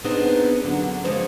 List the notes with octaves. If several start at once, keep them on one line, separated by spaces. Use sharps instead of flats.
B3 C4 D4 D#4 G#4
F#2 D3 F#3
G2 F3 G#3 A#3 C5 C#5